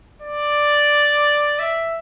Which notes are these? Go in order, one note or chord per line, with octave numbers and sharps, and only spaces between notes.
D5
E5